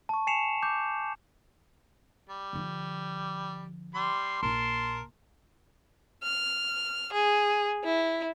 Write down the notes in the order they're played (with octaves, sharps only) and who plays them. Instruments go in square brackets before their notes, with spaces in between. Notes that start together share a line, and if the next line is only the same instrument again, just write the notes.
[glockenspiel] A5 C#6
G#5 C7 C#7 E7 F7
D6 G6
[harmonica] G3
[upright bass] D3 F3
[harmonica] G3 C6
[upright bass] A#1 A#2 [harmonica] A#4 A5 C6
[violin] F6
G#4
E4